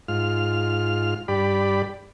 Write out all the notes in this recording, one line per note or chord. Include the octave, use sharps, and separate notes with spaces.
G#2 F4 F6
G2 G4 D5 B5